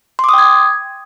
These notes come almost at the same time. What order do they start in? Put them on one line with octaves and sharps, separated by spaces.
C6 D6 D#6 G5 G#6